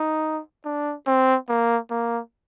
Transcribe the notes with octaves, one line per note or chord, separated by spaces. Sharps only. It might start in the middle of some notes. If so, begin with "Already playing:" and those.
Already playing: D#4
D4
C4
A#3
A#3